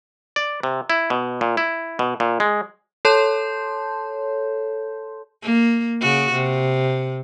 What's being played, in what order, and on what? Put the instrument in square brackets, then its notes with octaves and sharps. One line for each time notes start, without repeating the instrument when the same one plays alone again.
[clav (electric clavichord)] D5
C3
E4
B2
A#2
E4
B2
A#2
G#3
[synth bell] A4 C#5 A5 C6 G6
[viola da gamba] A#3
C#3 F#4
C3